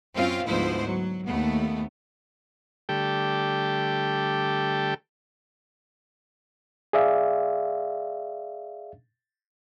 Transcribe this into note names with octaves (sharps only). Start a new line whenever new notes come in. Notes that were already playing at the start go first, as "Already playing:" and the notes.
F#2 C4 C#4 F4 F5
D2 G#2 F3 B3 E4 C5
F#3
D#2 A3 B3
D3 G3 A3 G4 A4 G5
G#4 D5 E5 F5